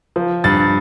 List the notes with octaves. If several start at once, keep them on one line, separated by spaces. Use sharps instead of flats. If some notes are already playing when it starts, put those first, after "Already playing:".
F3
G2 A6